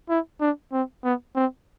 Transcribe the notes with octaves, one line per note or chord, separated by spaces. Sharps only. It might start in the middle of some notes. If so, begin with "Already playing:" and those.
E4
D4
C4
B3
C4